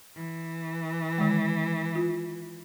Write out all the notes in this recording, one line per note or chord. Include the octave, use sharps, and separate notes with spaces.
E3
D#3 G#3
F4